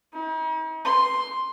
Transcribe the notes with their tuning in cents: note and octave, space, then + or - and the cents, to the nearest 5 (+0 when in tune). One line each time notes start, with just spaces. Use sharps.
D#4 +45
C6 +5